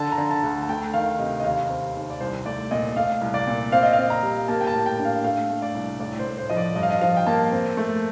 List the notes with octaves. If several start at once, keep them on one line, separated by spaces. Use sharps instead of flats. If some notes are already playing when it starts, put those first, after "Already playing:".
Already playing: D3 A5
A#5
D3
A5
D2
A5
A3 G5
D#3 F5
C3 D#5
D#5
D#2 F5
C4
D#2
D5
C2 C5
A3 D5
A#2 D#5
A3 F5
C2
D5
A#2
C4 F5
D#5
C4 F5
A#5
G3
A#3 A5
G5
A5
A2
G5
D4
F5
A3 F5
A3
D5
C2
A2 D5
C5
A2
C5
F3 D#5
D5
G2 D#5
F5
D#5
F3 F5
G5
A#3 A5
C4
A3